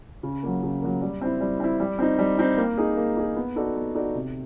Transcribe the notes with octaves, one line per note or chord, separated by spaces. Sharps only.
C#3
F#3 A#3
C#3
F#3 A#3
G3
C4 E4
G3
C4 E4
G3
C4 D#4
G3
C4 D#4
A#3
D#4 G#4
A#3
D#4 G#4
B3
D#4 F#4 A4 D5
B3
D#4 F#4 A4 D5
C3